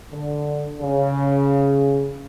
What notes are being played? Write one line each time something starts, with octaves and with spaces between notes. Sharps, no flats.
D3
C#3